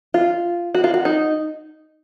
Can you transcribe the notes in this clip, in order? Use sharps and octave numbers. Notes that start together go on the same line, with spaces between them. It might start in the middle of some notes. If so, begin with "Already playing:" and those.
F4
F#4
F4
F#4
D#4